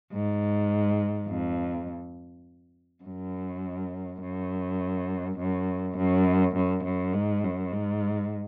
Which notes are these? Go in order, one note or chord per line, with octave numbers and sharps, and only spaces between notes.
G#2
F2
F#2
F#2
F#2
F#2
F#2
F#2
G#2
F#2
G#2